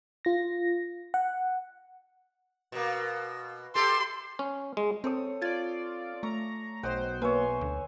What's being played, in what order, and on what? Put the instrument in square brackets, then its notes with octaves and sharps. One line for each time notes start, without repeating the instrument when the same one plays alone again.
[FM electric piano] F4 A#6
F#5
[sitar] B2 A#3
[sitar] G4 A4 [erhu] C6
[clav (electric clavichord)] C#4
G#3
[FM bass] C4 [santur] A4 C#5 D#6
[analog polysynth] F4 D5 [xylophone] G#6 A6
[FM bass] A3 [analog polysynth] A#5 [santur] C#6
[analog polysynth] B1 C5 [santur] D#5 F#5 G5
[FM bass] A#3 [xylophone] B4 [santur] C#5 E5 G#5
[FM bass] D2